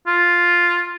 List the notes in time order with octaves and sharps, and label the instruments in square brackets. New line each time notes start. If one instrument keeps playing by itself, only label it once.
[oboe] F4